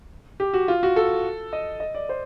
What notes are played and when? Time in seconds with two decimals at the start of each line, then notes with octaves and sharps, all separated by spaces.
0.40 G4
0.54 F#4
0.68 F4
0.83 F#4
0.96 A4
1.53 D#5
1.80 D#5
1.95 D5
2.09 C5